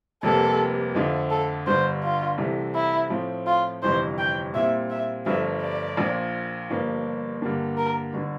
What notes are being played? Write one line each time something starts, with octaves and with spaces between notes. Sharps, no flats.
F1 F2 C3 G3 A#3 A4
F2 D3 F3 A3
A4
G1 G2 D3 C5
F4
C2 C3 E3 A3
E4
A2 F3 A3 C4
F4
G1 F2 C3 E3 C5
G5
A#2 G3 C4 E4 E5
E5
G1 G2 F3 A3 E5
D5
A#1 A#2 F3
G1 G2 F3 A#3
G2 D3 G3 A#3 D4
A#4
G1 D3